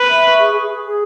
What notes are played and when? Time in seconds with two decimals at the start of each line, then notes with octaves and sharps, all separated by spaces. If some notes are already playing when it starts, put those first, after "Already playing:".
Already playing: B4
0.08 E5
0.23 C#6
0.39 G#4
0.53 G#4
0.69 G#4
0.84 G#4